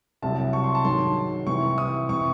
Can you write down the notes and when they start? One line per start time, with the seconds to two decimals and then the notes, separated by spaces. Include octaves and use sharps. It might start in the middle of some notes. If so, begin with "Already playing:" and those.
0.22 C2 C3 F#3 A5
0.53 C#6
0.64 C6
0.75 A5
0.84 G#2 D#3 F#3 C6
1.47 C2 C3 E3 C#6
1.78 D#6
2.09 C3 E3 C#6